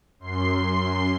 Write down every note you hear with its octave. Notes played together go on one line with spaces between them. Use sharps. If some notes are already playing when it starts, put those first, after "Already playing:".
F#2 C6 C7